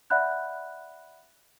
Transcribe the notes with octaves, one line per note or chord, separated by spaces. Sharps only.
D5 E5 F#5 B5 F#6 G6